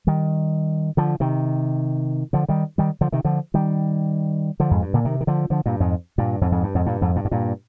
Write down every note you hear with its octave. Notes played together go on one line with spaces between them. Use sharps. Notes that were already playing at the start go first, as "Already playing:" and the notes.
D#3 G3
D3 F3
C3 D#3
D3 F3
D#3 G3
D#3 G3
D3 F3
C3 D#3
D3 F3
D#3 G3
D3 F3
F2 G#2
G2
A#2 D3
C3 D#3
D#3
D3 F3
D3 F3
G2 A#2
F2 G#2
G2 A#2
F2 G#2
F2 G#2
G2
F2 G#2
G2 A#2
F2 G#2
G2 A#2
G#2
G2 A#2